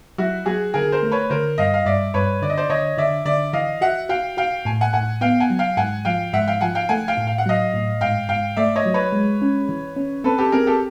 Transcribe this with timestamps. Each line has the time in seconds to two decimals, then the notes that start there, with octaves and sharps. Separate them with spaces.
0.18 F#3 E4 F#4
0.46 F#3 F#4 G#4
0.74 D3 G#4 A#4
0.92 A#4 C5
1.03 A3
1.12 B4 C#5
1.30 D3 A#4 C5
1.58 G2 D#5 F5
1.74 F5
1.85 G2 D5 E5
2.14 G2 B4 C#5
2.42 D3 D5
2.50 D#5
2.58 C5 D5
2.69 D3 C#5 D#5
2.98 D3 D5 E5
3.25 D3 D5 E5
3.53 E3 D#5 F5
3.81 F#4 E5 F#5
4.09 F#4 F5 G5
4.37 F#4 F5 G5
4.65 A2 G#5
4.81 F#5 G#5
4.93 A2 F#5 G#5
5.21 B3 F5 G5
5.40 F#5 G#5
5.50 F#3
5.59 F5 G5
5.77 G#2 F#5 G#5
6.05 F3 F5 G5
6.33 G#2 E5 F#5
6.48 F5 G5
6.61 F3 F#5 G#5
6.75 F5 G5
6.89 A3 F#5 G#5
7.08 F5 G5
7.17 A2
7.27 F5
7.38 F#5
7.46 F#3 D#5 F5
7.74 A2
8.01 G#2 F5 G5
8.29 G#2 F5 G5
8.57 A3 D5 E5
8.76 C#5 D#5
8.86 F#3
8.94 B4 C#5
9.12 G#3
9.42 C#4
9.69 E3
9.96 C#4
10.24 C4 A4 B4
10.38 G4 A4
10.52 C4 G#4 A#4
10.67 G4 A4